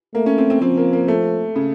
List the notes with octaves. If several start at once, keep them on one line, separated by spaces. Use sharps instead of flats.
A3 A#3
C#4
C4
C4
F3 C4
A#3
A#3
A3
C#3